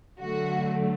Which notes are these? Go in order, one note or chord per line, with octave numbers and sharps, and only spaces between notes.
D3 F#3 A3 F#4